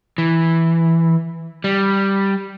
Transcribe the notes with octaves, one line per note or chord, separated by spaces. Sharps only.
E3
G3